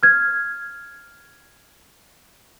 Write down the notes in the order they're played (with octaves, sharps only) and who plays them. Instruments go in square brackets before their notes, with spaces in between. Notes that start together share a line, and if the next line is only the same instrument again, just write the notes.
[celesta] F6 G#6